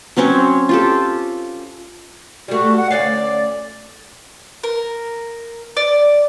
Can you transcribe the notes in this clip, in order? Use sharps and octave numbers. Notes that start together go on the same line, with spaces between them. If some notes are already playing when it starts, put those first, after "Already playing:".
F#3 C4 C#4 C#5
F4 G4 A4
G3 A3 F#4
F#5
D2 C#4 D5 F5
A#4
D5